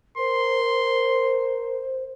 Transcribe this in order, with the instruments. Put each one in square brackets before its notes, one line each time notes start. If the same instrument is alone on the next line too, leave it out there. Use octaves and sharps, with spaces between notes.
[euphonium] A#4 [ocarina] C5 [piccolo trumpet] C6